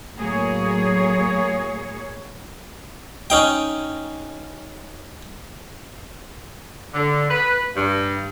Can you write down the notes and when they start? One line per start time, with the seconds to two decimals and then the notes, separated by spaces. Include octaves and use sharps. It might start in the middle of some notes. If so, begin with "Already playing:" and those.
0.17 A2 F#3 A#3 G#4 C#5
3.30 C#4 D#4 G5
6.93 D3
7.30 B4
7.74 G2